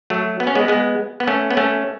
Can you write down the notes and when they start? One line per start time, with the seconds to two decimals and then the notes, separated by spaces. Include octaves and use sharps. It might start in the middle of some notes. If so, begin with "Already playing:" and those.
0.10 F#3 A3
0.40 B3
0.47 C#4
0.55 G#3 B3
0.68 G#3 B3
1.20 B3
1.28 A3 C#4
1.50 B3
1.57 A3 C#4